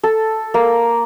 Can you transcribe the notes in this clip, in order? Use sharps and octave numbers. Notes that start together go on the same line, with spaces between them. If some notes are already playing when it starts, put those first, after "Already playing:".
A4
A#3